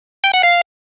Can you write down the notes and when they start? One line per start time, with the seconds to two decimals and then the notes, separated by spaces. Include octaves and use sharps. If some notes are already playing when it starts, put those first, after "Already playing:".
0.24 G5
0.34 F#5
0.43 F5